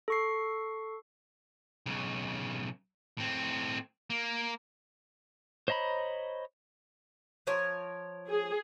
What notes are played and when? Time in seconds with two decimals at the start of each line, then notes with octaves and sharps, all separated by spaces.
0.08 A4 C#6 C7
1.86 B1 C#3
3.18 A2 C4
4.10 A#3
5.68 C5 C#5 D#5 A#5 B5
7.47 F3 A#4 C#5
8.29 G#4